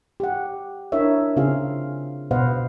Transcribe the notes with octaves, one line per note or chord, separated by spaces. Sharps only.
G4 F#5
D4 E4 A#4 C#5 D#5 E5
C#3 C4 F4 G#4 F5
B2 B4 C5 D#5 F5 F#5